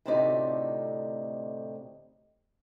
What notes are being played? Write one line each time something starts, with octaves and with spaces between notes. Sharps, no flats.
D2 A2 C3 C4 D#4 D5